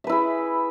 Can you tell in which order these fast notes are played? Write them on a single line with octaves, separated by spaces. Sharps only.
E5 B4 E4 G#4